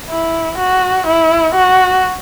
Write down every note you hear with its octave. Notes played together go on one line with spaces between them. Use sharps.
E4
F#4
E4
F#4